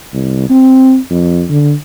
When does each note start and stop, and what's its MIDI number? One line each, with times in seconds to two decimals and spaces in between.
0.13 0.48 36
0.50 0.98 60
1.10 1.44 41
1.50 1.74 50